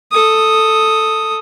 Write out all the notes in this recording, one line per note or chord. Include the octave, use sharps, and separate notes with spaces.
A4 D#6